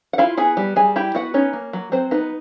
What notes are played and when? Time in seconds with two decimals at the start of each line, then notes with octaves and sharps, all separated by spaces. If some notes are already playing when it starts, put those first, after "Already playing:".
0.13 F#5
0.18 E4 F4 F5
0.37 B3 G#4 G#5
0.57 G3
0.76 G3 G#4 G#5
0.96 E4 G4 G5
1.15 B3 F#4 F#5
1.34 C#4 D#4 C#5
1.53 A#3
1.73 F#3
1.92 F#3 C4 C5
2.11 B3 D#4 B4